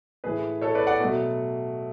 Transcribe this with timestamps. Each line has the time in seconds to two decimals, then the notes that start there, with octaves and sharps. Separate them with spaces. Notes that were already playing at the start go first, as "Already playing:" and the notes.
0.24 A2 E3 A3 G#4 B4
0.61 A4 C#5
0.75 B4 D5
0.87 D5 F#5
1.00 B2 F#3 A3